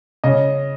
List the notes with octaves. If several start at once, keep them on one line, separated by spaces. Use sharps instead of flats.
C#3 D#5